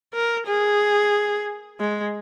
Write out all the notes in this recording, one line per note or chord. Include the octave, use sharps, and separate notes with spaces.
A#4
G#4
G#3